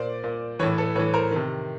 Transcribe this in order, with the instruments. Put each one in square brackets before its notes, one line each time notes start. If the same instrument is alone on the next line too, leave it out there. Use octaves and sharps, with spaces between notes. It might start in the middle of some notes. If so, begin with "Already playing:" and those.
Already playing: [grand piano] A#2 C5 D5
A#2
E3 B4 C#5
A2
A4 B4
A2 B4 C#5
E3
A#4 C5
C3 D#3